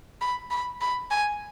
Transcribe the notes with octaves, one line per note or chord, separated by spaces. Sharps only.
B5
B5
B5
G#5